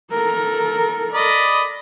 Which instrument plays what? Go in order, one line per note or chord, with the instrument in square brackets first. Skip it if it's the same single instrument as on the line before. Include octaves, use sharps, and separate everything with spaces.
[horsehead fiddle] A4 A#4
[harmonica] D5 D#5 B5